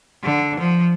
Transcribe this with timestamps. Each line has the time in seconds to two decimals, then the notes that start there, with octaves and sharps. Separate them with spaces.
0.24 D3
0.60 F3